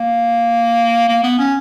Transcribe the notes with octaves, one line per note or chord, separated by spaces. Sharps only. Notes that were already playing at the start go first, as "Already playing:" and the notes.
Already playing: A#3
A#3
B3
C#4